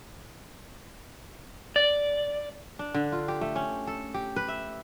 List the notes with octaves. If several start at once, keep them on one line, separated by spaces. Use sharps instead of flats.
D5
D4
D3
F4
G4
A3
C#4
A4
G4
B4
E5